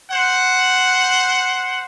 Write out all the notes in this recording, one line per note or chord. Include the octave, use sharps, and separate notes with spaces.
C5 F#5